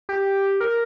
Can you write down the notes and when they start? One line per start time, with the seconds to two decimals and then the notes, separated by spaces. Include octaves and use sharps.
0.09 G4
0.60 A#4